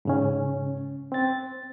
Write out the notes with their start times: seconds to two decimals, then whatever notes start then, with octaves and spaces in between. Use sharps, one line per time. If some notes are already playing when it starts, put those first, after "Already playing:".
0.05 G#2 C#3 C#4
1.12 C4 A6